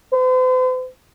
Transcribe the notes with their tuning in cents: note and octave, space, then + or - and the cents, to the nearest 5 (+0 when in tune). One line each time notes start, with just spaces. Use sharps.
C5 -45